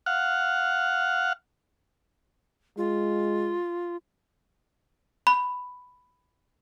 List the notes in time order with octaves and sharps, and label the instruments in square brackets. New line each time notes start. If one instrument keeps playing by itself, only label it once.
[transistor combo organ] F5 F#5
[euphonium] G#3 [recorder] F4
[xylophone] B5